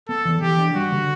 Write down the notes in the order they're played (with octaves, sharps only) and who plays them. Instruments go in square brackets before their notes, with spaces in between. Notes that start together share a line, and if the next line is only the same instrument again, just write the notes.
[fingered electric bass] B3 [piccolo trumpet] A4
[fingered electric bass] E3
[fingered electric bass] E3 [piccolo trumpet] G4
[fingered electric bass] D4
[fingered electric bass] G3 [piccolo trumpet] F#4
[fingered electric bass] D3